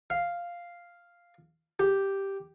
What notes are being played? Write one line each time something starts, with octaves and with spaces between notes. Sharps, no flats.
F5
G4